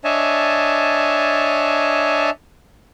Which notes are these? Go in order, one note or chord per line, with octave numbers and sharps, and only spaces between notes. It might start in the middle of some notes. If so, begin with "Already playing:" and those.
D4 C#5 D#5 E5 G#5 A5